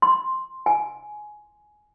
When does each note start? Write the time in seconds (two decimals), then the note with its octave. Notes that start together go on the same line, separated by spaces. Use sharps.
0.02 C6
0.66 G#5